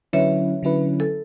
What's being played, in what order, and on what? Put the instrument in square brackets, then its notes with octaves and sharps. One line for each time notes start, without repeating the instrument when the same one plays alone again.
[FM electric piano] D3 F#3 C#4 E4 B4 [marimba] C#5 E5
[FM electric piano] D3 F#3 C#4 E4 B4
[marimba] A4